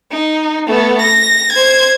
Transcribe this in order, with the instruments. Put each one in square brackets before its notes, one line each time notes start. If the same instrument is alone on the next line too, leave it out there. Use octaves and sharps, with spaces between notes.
[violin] D#4
A3 B3
A#6
C5 G#6